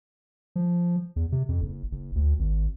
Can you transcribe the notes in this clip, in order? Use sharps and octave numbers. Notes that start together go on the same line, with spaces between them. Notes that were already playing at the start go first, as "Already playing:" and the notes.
F3
E2
C3
F2
F#1
F#1
D2
G#1